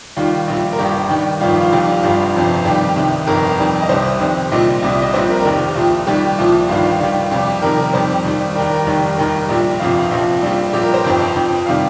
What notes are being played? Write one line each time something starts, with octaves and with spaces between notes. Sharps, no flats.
D#2 D#3 G3 F4
A#1 A#2 G3
A#4
G1 G2 G3 G4
D#2 D#3 G3
G1 F2 D#3 G3 F4
F4
F1 F2 D#3 G3
G1 G2 G3 F4
G1 F2 C3 F3
F2 D#3 G3 G4
C2 C3 D#3
G1 F2 D#3 A#4
F2 D#3 G3
D#5
C2 C3 G3 C5
F2 C3 D#3
A#1 A#2 G3 D#5
C2 C3 G3
D#5
A#1 A#2 G3 C5
A#4
A#4
F1 D#2 D#3 G4
C2 A#2 F3
D#2 D#3 G3 G4
C2 A#2 F3
G1 G2 D#3 G3 F4
D#2 D#3 G3
F2 C3 G3 G4
G4
F2 C3 D#3 G3 A#4
A#4
F2 D#3 G3 C5
D#2 D#3 G3
D#2 D#3 G3 A#4
A#4
F1 D#2 D#3 G3
F1 D#2 D#3 G3 A#4
A#1 A#2 G3
G1 F2 C3 F4
A#1 A#2 F3
A#1 A#2 G3
A#1 A#2 G3 G4
A#4
C5
G1 F2 F3 G5
G5
F2 F3
C3 D#3 G3 F5